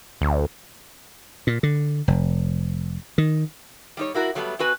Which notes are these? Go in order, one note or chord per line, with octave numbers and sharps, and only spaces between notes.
D2
A#2
D3
F1
D#3
G3 D#4 C#5
A#3 E4 F#4 A#4
F#3 G3 A3 B3
C4 F#4 B4 G#5